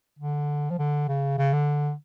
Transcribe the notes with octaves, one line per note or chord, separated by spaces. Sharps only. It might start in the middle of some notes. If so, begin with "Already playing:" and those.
D3
F3
D3
C#3
C#3
D3